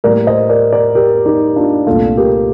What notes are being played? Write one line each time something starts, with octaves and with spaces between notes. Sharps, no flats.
A2 G3 A#3 A#4 D5
C5 D#5
A#4 D5
A#4 D5
G4 A#4
D#4 G4
D4 F4
C2 A#2 A3 F4 A4
G4 A#4